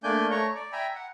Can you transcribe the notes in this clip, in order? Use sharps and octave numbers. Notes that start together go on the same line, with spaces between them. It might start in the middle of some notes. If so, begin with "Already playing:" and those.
A3 A#3 D4 D5 G#5 G6
A3 C#5 A#5 C#6
D5
E5 G5 G#5 A#5 B5
F#5